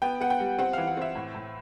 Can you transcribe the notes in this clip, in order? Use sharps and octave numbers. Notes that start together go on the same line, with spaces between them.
B3 G5
B3 F#5
G5
G3
C4 F#5
E3 F5
F#5
C4 E5
A2
A2